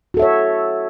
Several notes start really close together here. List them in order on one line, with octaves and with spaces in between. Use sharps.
F#4 A4 E5 C#5